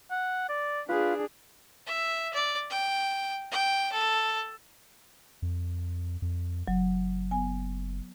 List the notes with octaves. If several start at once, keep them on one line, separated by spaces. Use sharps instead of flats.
F#5
D5
D4 F4 G#4 B4
E5
D5
G5
G5
A4
F2
F2
F#1 F#3
B3 G#5